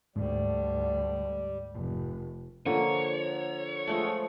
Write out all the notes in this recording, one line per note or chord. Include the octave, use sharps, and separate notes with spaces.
D2 G#2 D3 G3
F1
D3 F3 A#3 C#5
F3 G#3 A3